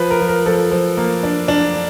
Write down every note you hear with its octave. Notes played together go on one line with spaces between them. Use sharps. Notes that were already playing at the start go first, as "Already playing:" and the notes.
Already playing: F3 B4
A#4
F3
A#4
F3 A4
F3
A#3
D4
D4